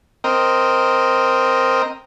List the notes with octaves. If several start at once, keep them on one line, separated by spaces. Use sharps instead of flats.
C4 A#4 D#5